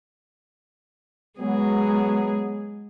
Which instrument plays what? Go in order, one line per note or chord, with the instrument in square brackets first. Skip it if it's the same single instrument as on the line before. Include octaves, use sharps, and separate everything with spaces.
[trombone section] F#3 B3 [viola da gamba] G#3 G#4